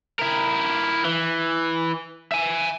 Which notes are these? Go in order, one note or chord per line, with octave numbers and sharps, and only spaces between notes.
E4 A#4
E3
E5 G#5